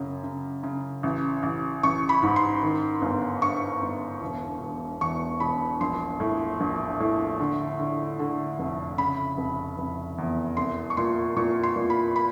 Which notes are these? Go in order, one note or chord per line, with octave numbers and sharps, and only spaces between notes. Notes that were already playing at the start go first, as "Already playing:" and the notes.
Already playing: F#2 C#3
C#3
C#3
A1
A1
A1 C#6
B5
G#2
C6
D#3
G1
G2 C#6
G1
E1
E1
E2 C#6
E1 B5
A#1 C6
A2
A#1
A2
D3
D3
D3
F1
C#3 B5
F1
F1
E2
C2 C6
C#6
A#2 C6
A#2 C#6
C6
A#2
B5
B5